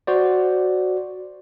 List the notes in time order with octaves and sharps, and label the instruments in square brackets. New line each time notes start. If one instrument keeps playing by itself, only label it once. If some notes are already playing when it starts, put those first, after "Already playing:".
[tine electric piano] F#4 C5 D5